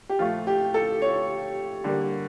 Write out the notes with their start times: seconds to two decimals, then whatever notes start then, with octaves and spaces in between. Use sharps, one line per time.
0.09 G4
0.19 A#2 F3 A3 F4
0.47 G4
0.74 A4
1.02 C#5
1.84 D3 G3 A#3